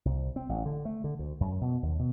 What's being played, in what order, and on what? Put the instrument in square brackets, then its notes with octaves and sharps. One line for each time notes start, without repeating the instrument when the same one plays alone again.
[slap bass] C2
C4
A1
D3
A3
D3
D2
F#2
B2
D#2
B2